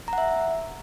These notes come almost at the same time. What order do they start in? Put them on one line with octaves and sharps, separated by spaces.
A#5 F#5 E5